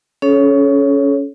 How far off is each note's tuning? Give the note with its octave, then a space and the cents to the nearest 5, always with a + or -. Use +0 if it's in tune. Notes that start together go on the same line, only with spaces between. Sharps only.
C#4 +15 A4 -35 C#5 +0